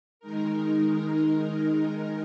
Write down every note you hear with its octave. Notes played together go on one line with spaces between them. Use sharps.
D#3 G#3 D#4 A#4